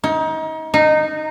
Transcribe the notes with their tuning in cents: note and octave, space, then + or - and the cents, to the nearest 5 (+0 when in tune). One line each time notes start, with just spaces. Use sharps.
D#4 +30
D#4 -15